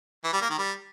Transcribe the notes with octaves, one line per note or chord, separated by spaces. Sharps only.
E3
G3
A#3
D#3
G3